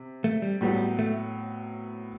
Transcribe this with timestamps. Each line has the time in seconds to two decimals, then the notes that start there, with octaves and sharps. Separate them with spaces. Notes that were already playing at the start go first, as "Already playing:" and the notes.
Already playing: C3
0.24 A3
0.42 G3
0.61 A2 F#3 G3 B3
0.99 A3